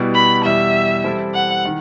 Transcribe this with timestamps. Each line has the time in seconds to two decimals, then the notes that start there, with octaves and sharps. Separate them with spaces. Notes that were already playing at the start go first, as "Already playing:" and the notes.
Already playing: B2 G3 B3 E4
0.15 B5
0.44 E2 B2 G3 E5
1.04 E3 G3 C4 E4 A4
1.34 F#5
1.65 D#3